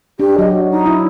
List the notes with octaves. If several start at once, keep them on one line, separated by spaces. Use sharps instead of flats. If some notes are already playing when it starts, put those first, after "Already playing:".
D4 G4
F#3 D#5
D#4
E4